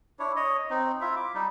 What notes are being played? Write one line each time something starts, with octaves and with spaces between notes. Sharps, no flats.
D4 E4 C#5
C#5 D#5
C4 D#4
E4 F4 E5
D6
G3 D#4